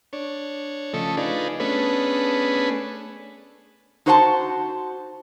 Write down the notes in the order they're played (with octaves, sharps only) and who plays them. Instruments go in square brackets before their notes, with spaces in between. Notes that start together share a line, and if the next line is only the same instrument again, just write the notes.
[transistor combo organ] D4 C#5
C#3 F3 A3 A4 D#5 C#6
D4 D#4 F4 G#4 B4 D5
A3 B3 C#4 D4 G#4 B4
[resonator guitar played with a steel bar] D#4 F#4 C5 F#5 G#5 A5